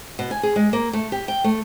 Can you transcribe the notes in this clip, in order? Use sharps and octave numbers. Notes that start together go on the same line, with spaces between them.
B2
G#5
G#4
G#3
A#3
A3
G4
G5
A3